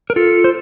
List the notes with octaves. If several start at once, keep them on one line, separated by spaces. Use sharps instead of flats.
A#4
F4 A4
C5